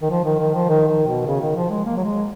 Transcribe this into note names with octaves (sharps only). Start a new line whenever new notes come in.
D#3
F3
D#3
D#3
F3
D#3
D#3
B2
C#3
D#3
F3
G#3
A#3
F#3
G#3